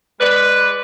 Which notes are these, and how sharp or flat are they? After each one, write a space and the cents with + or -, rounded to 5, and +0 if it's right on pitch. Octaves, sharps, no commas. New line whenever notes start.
G#3 -20 B4 +0 D5 +0